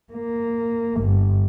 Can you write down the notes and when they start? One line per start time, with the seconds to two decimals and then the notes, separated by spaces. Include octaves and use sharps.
0.13 A#3
0.98 G1 G2